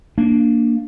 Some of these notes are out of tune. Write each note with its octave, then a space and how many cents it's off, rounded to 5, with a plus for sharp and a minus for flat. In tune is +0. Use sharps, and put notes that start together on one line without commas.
A#3 +0 D4 +0